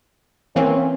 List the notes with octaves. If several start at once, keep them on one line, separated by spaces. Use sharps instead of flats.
E3 A#3 C4 C#4